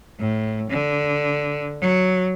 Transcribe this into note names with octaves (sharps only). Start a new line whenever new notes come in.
A2
D3
F#3